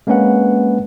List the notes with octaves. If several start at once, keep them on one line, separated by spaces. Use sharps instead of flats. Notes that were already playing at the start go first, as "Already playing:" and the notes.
G#3 A#3 C4 C#4 B4 F#5